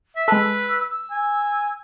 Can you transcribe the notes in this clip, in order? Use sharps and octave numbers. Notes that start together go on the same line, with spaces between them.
E5
G#3 A4 B4 E6
E6
G#5